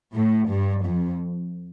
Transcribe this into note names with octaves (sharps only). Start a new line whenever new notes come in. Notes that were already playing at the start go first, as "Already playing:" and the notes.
A2
G2
F2